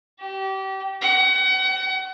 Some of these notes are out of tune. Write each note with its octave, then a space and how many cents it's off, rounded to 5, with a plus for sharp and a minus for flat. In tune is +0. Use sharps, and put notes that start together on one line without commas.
G4 -30
F#5 +35